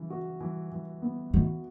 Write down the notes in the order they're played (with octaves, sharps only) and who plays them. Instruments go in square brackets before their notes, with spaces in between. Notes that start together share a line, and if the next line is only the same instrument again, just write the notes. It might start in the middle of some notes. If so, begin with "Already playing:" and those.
Already playing: [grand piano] C#3 E3
F#4
E3
E3
B3
[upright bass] D#3 [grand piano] F#4